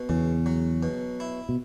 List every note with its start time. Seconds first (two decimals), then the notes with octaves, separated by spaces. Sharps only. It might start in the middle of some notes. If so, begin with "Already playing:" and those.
Already playing: B2
0.09 E2 C#3
0.46 F#3
0.83 B2
1.20 E4
1.49 B2